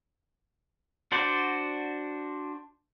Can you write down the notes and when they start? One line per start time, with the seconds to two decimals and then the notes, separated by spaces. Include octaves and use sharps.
1.12 D4 F#4 C5 D5